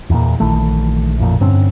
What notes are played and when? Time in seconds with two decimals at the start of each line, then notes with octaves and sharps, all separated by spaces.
0.10 E2 A#2
0.40 A#1 D#3 E3 A3
1.18 A1 F2 A#2
1.41 G2 D3 C4 C#4